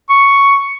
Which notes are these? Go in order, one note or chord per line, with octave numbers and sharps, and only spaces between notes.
C#6